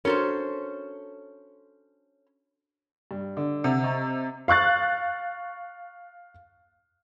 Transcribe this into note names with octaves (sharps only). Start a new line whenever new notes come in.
C#4 D4 F#4 A4 A#4 C5
G2
D3
C3 F#5
D#5 A#5 C#6
F5 C#6 F#6 A6